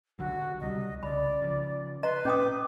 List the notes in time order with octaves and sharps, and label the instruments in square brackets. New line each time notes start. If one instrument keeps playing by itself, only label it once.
[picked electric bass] B1 D3 F#3 [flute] F#4
[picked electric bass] C#2 C3 G3 [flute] D#5
[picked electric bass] C2 C#3 [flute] D5 [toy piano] B5
[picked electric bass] C#3 F3
[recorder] B4 [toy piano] D#5 A#5 [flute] C6
[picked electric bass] A#2 [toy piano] C#4 G5 D#6 [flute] D6